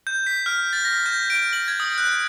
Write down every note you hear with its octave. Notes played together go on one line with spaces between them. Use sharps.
G6
B6
F6
A6
A#6
G6
D7
F#7
G#6
D#6
F#6